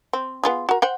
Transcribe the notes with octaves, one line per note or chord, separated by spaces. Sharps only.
C4
B3 F4 G#4
F#4 A#4
C5 F#5 G5